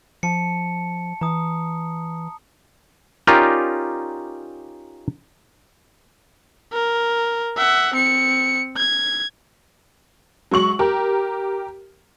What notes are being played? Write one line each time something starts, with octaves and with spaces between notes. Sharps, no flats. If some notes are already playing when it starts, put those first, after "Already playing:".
F3 A5 C#7
E3 A#5 D#6
C#4 D#4 F4 G4 A#4 D5
A#4
E5 F#5
C4 C#7
G#6
F#3 G#3 C#6 F#7
G4 A#4